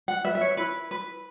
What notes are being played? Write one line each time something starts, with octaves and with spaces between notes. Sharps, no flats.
F#5
B4 E5
E5
C#5
E4 B4
B4